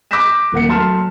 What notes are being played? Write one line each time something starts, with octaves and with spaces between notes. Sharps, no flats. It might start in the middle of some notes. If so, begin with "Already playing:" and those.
D6 F#6 G6 A#6 B6 E7
D#1 A#3 F#5 C#7
F#3 A3 A5 C6 F6 E7